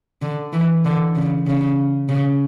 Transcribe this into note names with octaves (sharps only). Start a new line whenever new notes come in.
D3
E3
D3
C#3
C#3
C#3